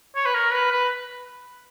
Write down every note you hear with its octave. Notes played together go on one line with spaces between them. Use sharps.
C#5
B4
A#4
B4
B4